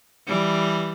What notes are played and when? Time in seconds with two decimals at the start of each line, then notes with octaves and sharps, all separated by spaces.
0.27 E3 G3